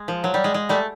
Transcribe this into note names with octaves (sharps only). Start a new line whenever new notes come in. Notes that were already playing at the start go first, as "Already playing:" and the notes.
Already playing: G#3
F3
F#3
G3
G#3
G#3
G3 A3